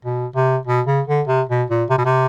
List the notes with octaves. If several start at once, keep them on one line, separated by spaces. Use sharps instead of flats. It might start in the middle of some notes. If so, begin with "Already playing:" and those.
B2
C3
B2
C#3
D3
C3
B2
A#2
C3
B2
C3